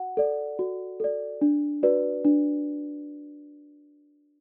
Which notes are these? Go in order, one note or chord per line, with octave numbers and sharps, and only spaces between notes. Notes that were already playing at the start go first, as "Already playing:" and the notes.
Already playing: F#4 F#5
A4 D5
F#4
A4 D5
D4
F#4 B4 D5
D4